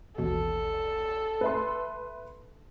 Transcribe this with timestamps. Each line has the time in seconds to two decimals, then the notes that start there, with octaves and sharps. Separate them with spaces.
0.18 A1 D#2 B2 A4
1.41 B4 E5 C6